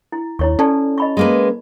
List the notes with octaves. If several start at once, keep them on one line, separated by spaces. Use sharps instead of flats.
E4
D#2 E4 C#5 C#6
C#4 A4 D5 A5
D#5 B5 C#6
G#3 A#3 B4